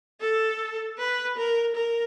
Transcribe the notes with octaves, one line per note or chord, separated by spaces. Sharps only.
A4
B4
A#4
A#4